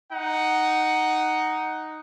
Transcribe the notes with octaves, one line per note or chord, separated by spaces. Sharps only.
D#4 F#5